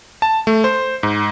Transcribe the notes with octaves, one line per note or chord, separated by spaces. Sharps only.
A5
A3
C5
G#2